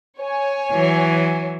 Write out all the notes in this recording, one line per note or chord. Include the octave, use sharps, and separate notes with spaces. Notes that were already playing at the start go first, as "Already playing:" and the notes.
C#5 G#5
E3 F#3